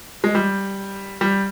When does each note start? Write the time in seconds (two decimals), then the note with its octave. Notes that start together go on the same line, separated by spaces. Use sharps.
0.24 G#3
0.35 G3
1.21 G3